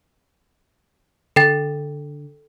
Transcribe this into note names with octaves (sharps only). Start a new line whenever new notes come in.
D3 A4 G5 A6